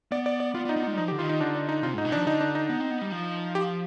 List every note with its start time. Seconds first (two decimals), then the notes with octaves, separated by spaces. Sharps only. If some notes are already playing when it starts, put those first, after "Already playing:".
0.11 B3 D5
0.26 D5
0.40 D5
0.54 B3 F4
0.65 B3
0.69 D#4
0.76 B3
0.83 D#4
0.87 G#3
0.93 G3
0.98 F3 D#4
1.08 G4
1.12 D3
1.19 D#3 F4
1.29 D#4
1.41 D3 D4
1.55 D4
1.69 D#4
1.83 C3 F4
1.94 G#2 D#4
2.05 B2
2.12 D4
2.16 F3
2.27 D3 D#4
2.41 D4
2.55 D#4
2.69 B3
2.80 C4
2.91 B3
3.01 G3
3.12 F3
3.55 G4